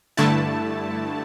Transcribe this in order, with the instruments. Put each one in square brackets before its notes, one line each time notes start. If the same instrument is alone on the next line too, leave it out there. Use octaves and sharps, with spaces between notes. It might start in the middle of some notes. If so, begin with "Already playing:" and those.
[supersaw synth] G2 D3 A3 E4 A5